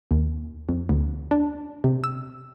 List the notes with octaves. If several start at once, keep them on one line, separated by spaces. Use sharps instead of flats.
D#2
F2
D2
D4
C3
E6